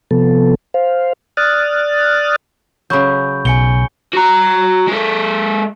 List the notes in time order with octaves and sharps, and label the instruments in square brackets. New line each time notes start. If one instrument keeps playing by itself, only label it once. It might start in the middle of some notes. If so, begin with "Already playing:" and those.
[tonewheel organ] C3 F3 B3 A4
C5 F5
D5 D#6 F6 F#6 A6
[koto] C#3 F#3 [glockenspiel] B5 C#6 G6
[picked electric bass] B1 [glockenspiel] G#5 C#7 G7
[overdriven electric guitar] F#4 A#5
G#3 A4